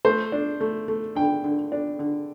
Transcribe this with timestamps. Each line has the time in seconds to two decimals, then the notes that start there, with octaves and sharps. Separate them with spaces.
0.05 A3 C5
0.32 D4
0.61 A3
0.88 A3
1.15 D3 G5
1.44 D3
1.72 D4
1.99 D3